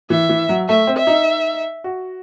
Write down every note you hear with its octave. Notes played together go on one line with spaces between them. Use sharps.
E3 E5
E3
F#3
A3 E5
C4
E5
D#4
F#4